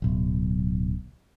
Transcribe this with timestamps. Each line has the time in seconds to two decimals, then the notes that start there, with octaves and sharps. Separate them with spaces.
0.02 D1 B1